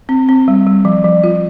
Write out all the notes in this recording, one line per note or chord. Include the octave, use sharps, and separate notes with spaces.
C4
C4
G3
G3
F3
F3
F4